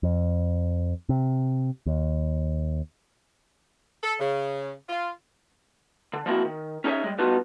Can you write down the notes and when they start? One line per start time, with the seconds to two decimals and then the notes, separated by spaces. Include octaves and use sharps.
0.03 F2
1.09 C3
1.86 D#2
4.03 A4
4.20 C#3
4.89 F4
6.13 D3
6.26 F3 G3 A#3 C4 E4 F#4
6.45 D#3
6.84 C#4 D#4 G#4 C5 C#5 E5
7.04 G3 G#3
7.18 G3 B3 D4 D#4 F4 F#4